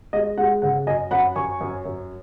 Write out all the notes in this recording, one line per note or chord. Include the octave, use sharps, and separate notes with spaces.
G#3 D#5
G#3 F#5
C#3 F#5
F#2 D#5 G#5
F#2 F#5 B5
F#2 G#5 C#6
F#2
F#2